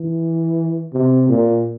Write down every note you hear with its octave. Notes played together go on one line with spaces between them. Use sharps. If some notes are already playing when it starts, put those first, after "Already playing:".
Already playing: E3
C3
A#2